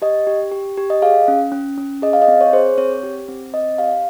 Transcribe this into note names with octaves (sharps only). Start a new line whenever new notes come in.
G4 D#5
G4
G4
G4
D#5
G#4 F5
C#4
C#4
C#4
G#4 D#5
F5
D#5
C4
C#5
G#4 C5
C4 C#5
G4
C4
C4 D#5
G4 F5